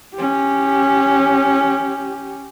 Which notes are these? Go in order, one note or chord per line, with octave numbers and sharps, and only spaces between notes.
C#4 G4